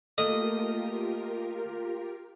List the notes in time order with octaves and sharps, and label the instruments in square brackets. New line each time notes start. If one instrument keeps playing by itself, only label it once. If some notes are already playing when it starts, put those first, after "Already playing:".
[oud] A3 A#3 F5 [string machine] F4 G4 A#4 [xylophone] A4 [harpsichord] D#5